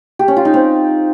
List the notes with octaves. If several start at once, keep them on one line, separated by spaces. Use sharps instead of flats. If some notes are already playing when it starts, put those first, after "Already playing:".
G4
C#4
F4
D#4
C4